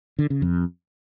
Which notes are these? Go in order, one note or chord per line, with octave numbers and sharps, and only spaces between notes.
D3
C#3
F2